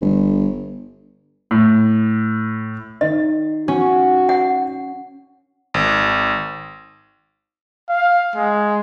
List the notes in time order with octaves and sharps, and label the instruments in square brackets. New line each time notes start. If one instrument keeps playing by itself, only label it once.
[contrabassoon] G1
[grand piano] A2
[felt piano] D#3 [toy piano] D#5
[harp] C#4 [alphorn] F#4
[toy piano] F#5
[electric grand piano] G#1
[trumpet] F5
G#3